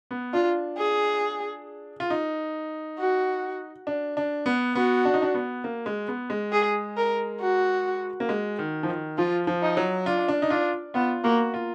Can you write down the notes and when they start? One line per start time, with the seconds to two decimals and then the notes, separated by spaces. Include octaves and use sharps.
0.11 B3
0.33 D4 F4
0.78 G#4
2.00 F4
2.10 D#4
2.98 F#4
3.87 D4
4.17 D4
4.46 B3
4.75 B3 F#4
5.05 D4
5.14 D#4
5.22 D4
5.34 B3
5.64 A#3
5.86 G#3
6.08 B3
6.30 G#3
6.52 G#4
6.97 A#4
7.41 F#4
8.20 A#3
8.29 G#3
8.59 D#3
8.83 F3
8.89 D#3
9.18 F3 F4
9.47 F3
9.62 D#4
9.77 F#3
10.06 D4 F4
10.28 D4
10.42 D#4
10.50 D4 F4
10.94 B3 F4
11.24 A#3 F#4
11.54 F4